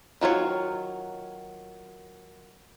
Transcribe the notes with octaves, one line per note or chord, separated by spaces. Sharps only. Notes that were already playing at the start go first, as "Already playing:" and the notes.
D#3 F#3 F4 C#5